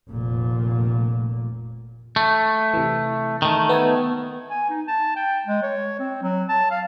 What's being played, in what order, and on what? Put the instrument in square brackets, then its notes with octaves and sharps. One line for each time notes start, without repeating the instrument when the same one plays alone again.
[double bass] F1 A#2
[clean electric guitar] A3
[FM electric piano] C3 E3
[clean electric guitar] D#3 A3
[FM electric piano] B3 A5 G#6
[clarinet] G#5
D#4
A5
G5
G#3
C#5
C4
F#3
A5
F5